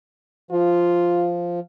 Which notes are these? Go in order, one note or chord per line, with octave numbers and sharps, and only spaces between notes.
F3 F4